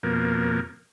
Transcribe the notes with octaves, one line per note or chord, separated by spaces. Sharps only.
F2 B2 A#3